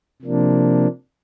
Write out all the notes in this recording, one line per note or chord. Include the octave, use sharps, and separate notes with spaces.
C3 F3 A#3 D4